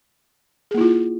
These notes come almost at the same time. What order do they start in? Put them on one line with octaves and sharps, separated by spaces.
G#4 A#3 E4 F4